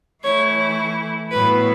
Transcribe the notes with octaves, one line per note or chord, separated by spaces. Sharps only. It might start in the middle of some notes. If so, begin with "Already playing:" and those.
E3 A3 E4 C#5
A2 F#3 B3 E4 B4